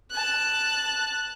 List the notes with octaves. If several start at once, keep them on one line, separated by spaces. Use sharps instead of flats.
A5 F#6